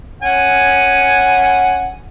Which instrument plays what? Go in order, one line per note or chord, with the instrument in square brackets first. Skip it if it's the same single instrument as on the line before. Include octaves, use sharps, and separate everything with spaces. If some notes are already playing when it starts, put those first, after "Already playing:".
[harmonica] C#4 F#5 G#5